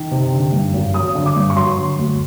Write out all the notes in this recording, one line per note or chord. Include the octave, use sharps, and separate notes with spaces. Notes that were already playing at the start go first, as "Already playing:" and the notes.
Already playing: D#3
C3
D3
G2
G#1
F#3 D#6
D3
D6
G2
C#6
F#3 C6
D3
D2